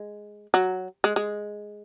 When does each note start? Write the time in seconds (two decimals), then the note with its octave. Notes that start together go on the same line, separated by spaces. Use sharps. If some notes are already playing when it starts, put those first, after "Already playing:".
Already playing: G#3
0.54 F#3
1.04 G#3
1.16 G#3